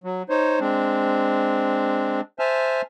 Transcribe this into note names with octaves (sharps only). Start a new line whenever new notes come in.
F#3
D#4 C5 C#5
G#3 C4 D4
C5 E5 G#5 A5 F6